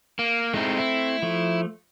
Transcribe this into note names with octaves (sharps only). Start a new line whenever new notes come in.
A#3
G#3 A3 C4 D#4 E4
E4
F3 A3